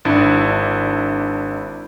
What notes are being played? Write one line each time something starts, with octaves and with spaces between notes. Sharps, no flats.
G#1 D4 E4